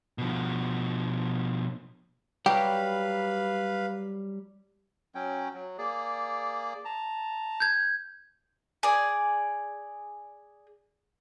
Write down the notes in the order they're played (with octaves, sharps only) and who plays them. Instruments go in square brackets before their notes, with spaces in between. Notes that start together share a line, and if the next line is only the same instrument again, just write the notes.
[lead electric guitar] B2 F3
[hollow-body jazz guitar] F#3 G3 [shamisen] G4 [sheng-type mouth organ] B4 F5
[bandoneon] F#3 C#4 G5
F#3
A#3 G#4 D5
A5 A#5
[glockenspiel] G6 G#6
[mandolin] G#4 D5